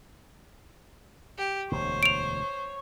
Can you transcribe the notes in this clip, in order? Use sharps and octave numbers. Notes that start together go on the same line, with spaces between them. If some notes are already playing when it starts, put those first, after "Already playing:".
G4
E1 D2 C5 C#5
D7 F7